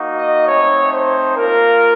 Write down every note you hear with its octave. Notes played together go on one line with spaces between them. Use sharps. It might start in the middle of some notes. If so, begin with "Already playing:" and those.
Already playing: A#3 D#4 F#4
D#5
A3 C4 D#4 C#5
C5
A#3 F4 A#4